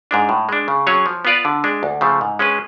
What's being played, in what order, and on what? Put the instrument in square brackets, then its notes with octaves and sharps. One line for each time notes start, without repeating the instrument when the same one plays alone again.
[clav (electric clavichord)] G#2 G#3 D4
A2
G#3 D4
C#3
F#3 C#4 G#4 C#5
F3
B3 F4 B4 D5
D3
G#3 D4
D2
C#3 F3 A3
G#2
G#3 C#4 G#4 B4